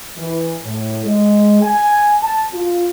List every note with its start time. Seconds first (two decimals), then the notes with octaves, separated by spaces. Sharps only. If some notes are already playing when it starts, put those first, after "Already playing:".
0.18 E3
0.64 A2
1.05 G#3
1.62 G#5
2.22 A5
2.53 F4